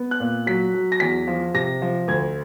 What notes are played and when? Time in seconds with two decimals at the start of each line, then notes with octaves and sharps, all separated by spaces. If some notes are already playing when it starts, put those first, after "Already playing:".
Already playing: B3
0.11 F#6
0.20 A#2
0.47 F#3 B6
0.74 F#3
0.92 A#6
1.00 E2 B6
1.28 F3
1.54 C3 A#6
1.82 F3
2.08 D2 G#6